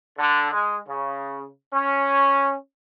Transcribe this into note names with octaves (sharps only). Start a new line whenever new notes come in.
D3
G#3
C#3
C#4